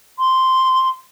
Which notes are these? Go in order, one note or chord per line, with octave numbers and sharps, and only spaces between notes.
C6